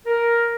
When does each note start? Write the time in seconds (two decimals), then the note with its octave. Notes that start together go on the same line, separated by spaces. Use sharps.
0.06 A#4